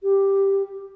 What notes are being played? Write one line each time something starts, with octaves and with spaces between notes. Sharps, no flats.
G4